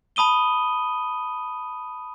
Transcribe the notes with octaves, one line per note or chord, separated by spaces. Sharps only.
A5 B5 D#6 D#7 G7